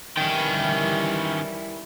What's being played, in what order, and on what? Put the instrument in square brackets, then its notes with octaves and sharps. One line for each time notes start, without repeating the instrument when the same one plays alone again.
[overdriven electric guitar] D#3 C#4 [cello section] E3 G3 E4 [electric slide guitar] A#4 G5